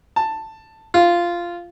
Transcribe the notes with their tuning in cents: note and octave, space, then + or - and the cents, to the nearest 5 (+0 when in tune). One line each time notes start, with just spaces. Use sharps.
A5 +10
F4 -10